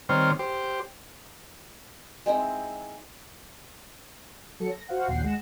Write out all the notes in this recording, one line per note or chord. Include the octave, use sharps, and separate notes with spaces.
D#3 G3 C4 C5 C#5 F6
G4 C5
G#3 C4 D#4 E4
F#3 A4 C#7
A#6
F#4 C5 F5 F#5
A#1 D#2 F#5 G5 C7
G#3 F#5 A#6 E7